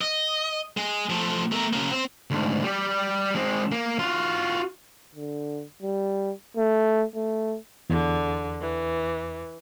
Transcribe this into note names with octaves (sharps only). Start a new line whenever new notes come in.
D#5
G#3
F3 A3
A3 A#4
C#3 A#3
C4
D2 G#2
G3 G4
G#3 C4
A#3
F4 F#4
D3
G3
A3
A3
E2 D3
E3